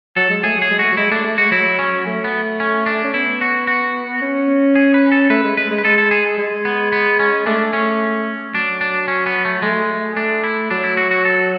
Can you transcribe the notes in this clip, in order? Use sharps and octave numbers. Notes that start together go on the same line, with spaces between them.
F#3 A4
G#3
A3 G#4
F#3 G#4
G#3
A3 F#4
F#3
G#3 E4
A3 D4
A3
G#3 F#4
F#3 E4
C#4
A3
B3
C#4
D4
C#4
B3 E4
F#4
F#4
C#4
G#4
B4
A4
A3 B4
G#3
G#3 B4
G#3
B4
G#3 A4
A4
G#4
G#3
B3
B3
C#4
A3 D4
C#4
F#3 D4
D4
C#4
B3
A3
G#3 A3
A3 D4
E4
F#3 D4
E4
F#4
F#4
A4